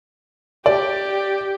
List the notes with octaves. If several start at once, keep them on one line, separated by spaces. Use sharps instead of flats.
G4 D5